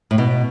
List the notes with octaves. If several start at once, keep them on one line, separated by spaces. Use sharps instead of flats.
A2
B2